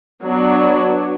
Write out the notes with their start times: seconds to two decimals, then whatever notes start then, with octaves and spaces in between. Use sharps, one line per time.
0.24 F#3 B3 D4